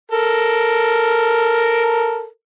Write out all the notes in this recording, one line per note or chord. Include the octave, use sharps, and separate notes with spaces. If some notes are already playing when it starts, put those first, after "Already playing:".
A4 A#4